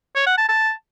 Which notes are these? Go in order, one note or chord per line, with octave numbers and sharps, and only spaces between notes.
C#5
F#5
A5
A5